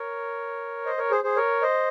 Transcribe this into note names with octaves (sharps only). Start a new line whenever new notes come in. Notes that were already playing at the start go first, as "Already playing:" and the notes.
Already playing: A#4 C#5
C5 D#5
A#4 C#5
G#4 C5
G#4 C5
A#4 C#5
C5 D#5